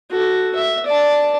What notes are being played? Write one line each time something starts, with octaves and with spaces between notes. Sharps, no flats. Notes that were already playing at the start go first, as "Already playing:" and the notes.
F#4 A4
E5
D5 A5